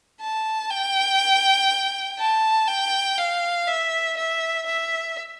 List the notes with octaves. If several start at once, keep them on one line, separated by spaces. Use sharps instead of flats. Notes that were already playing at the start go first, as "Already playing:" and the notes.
A5
G5
A5
G5
F5
E5
E5
E5